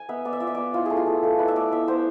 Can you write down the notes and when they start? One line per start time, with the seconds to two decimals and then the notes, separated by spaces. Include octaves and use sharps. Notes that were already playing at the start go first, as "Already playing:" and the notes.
Already playing: G#5
0.09 B3 E5
0.25 B3 D5
0.33 E5
0.40 F4 D5
0.47 E5
0.54 B3 D5
0.74 E4 F4
0.85 A3 G#4
0.97 F4
1.07 A3
1.23 A3 A4
1.39 E4 B4
1.48 E5
1.56 A3 D5
1.72 B3 E5
1.88 B3 C5